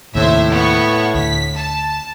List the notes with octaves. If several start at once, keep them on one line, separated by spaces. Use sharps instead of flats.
D#2 A2 C3 C5 E5
B3 C#6
D2 B6
A5